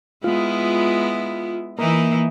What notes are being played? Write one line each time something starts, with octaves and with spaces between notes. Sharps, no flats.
G#3 B3 E4 F4
E3 A#3 D#4 E4